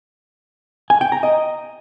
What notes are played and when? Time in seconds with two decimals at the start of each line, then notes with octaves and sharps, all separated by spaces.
0.90 G#5
1.01 G5
1.12 A#5
1.23 D#5